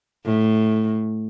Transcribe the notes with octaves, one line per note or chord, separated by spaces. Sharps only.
A2